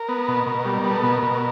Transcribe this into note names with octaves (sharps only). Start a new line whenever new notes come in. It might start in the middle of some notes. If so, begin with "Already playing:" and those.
Already playing: A#4
B3
B2
B2
G3
B3
A4
B2 A#4
B2